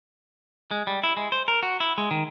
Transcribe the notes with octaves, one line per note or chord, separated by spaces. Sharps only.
G#3
G3
E4
G#3
C5
A#4
F#4
E4
G#3
D#3